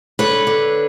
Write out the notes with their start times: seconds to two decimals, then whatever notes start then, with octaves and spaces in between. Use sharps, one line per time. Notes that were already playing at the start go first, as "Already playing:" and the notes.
0.19 D3 B4 C#5
0.47 D3